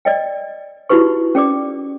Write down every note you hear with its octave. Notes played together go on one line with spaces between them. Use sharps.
D5 D#5 G5
D#4 E4 F#4 G4 B4 C#6
C#4 G#4 D5 D6